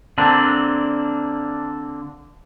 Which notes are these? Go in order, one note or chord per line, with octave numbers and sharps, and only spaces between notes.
D3 A#3 C4 D4